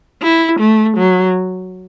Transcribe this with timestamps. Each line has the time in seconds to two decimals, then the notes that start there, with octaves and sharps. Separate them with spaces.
0.23 E4
0.60 A3
0.97 F#3